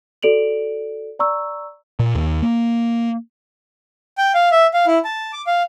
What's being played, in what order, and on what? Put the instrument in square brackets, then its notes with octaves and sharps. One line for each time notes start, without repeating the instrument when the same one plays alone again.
[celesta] F#4 A4 D5 D7 F7 F#7
D5 A#5 C#6 E6
[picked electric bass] A#2
D#2
A#3
[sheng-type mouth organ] G5
F5
E5
F5
E4
A5
D6
F5